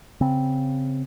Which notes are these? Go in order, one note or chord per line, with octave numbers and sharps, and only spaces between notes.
C#3 C4